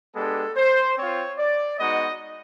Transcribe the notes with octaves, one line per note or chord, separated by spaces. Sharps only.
G#3 B3 D4 G4 A4
C5
C4 F4 C#5
D5
G#3 B3 D#4 F#4 D#5